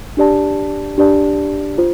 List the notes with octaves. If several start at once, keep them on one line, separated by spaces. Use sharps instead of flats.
D4 G4 D5 A5
D4 G4 D5 A5
F4 C5